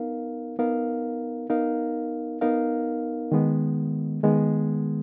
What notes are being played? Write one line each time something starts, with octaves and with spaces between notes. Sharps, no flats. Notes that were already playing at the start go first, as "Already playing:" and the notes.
Already playing: B3 D#4 A#4 F5
B3 D#4 A#4 F5
B3 D#4 A#4 F5
B3 D#4 A#4 F5
D#3 G#3 B3
D#3 G#3 B3